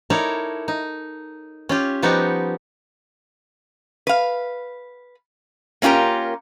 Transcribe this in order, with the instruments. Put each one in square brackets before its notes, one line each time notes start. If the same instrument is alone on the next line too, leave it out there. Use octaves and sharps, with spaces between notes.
[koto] D#4 E4 A4 A#4 C#5 D5
D#4
C#4 F4 G4
F3 G3 B3 D#4 F#4 G4
[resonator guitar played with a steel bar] B4 F5
A#3 C#4 F4 G4 A#4